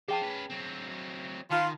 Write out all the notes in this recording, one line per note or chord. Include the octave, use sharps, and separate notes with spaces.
F4 G#4 C5 G5 A5
C#4 B4
F#3 C4
D#3 F4 A5 B5